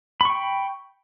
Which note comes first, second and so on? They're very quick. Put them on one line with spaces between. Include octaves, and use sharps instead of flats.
B5 C#6 G5